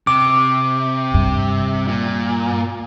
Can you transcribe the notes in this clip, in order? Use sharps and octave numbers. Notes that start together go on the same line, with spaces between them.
C3 D6
G2
A#2